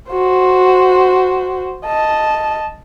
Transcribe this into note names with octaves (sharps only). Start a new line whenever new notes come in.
F#4 C5
D#5 A5